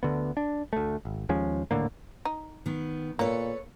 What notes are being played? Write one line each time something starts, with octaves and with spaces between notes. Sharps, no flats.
D2 D3 B3
D4
D2 A3
G#1
D#2 F3 G#3 C#4
D#1 A2 D3 A#3
D#4
D#3 B3
A#2 A#3 A4 B4 C#5